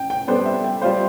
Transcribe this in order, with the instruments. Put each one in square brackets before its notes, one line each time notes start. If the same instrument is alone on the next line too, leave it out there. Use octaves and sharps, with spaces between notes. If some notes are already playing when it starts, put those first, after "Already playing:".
Already playing: [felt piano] G5
G5
[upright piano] G3 B3 D4 A4 C5 [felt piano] G5
[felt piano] E5
G5
[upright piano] G3 C4 F4 C5 [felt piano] F5